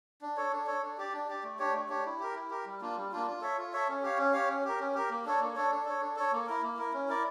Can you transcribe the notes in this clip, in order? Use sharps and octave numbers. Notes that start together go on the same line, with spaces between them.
D4
A4 C#5
D4
A4 C#5
D4
G4 D5
D4
G4 D5
A3
D4 G4 C#5
A3
D4 G4 C#5
E4
G4 A#4
E4
G4 A#4
G3
A#3 D4 F4
G3
A#3 D4 F4
F4
A4 C#5 E5
F4
A4 C#5 E5
C#4
G4 C#5 F5
C#4
G4 C#5 F5
C#4
G4 A#4
C#4
G4 A#4
A#3
D4 A4 C#5
A#3
D4 A4 C#5
D4
A4 C#5
D4
A4 C#5
A#3
E4 A#4
A#3
E4 A#4
C#4
E4 A#4 D5